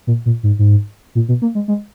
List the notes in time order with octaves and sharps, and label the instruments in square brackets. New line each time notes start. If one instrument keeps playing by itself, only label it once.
[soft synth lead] A#2
A#2
G#2
G#2
A#2
B2
A#3
G#3
G#3